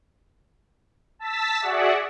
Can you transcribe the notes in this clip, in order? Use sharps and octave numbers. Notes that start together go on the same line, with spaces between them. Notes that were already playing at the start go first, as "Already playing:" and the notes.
A5 E6 A6 B6
F#4 G#4 D5 E5 F#5